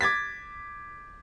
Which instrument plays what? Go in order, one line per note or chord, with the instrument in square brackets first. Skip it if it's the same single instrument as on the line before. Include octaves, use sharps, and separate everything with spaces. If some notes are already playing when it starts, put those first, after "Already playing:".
[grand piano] D6 G#6 A6 B6